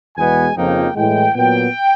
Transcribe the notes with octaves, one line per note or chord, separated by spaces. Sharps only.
E2 B2 G#3 B3 G#5
F2 C#3 F3 A#3 D#4 G5
A2 E3 G#3 G5
A#2 F#3 B3 G5